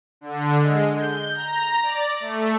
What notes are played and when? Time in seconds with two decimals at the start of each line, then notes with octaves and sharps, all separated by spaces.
0.21 D3
0.60 G#3
0.93 G6
1.33 A#5
1.82 D5
2.20 A3